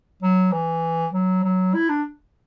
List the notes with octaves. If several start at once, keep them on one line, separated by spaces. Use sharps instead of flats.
F#3
E3
F#3
F#3
E4
D4